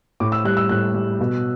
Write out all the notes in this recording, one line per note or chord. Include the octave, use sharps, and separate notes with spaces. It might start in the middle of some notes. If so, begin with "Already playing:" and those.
A2 D6
E6
G3 F#6
E6
A2 F#6
G3
B2